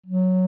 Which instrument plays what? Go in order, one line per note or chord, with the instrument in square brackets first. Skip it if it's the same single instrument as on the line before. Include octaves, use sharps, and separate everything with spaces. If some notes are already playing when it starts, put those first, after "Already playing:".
[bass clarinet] F#3